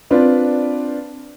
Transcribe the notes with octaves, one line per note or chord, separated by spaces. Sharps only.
C4 D4 F4 B4 D5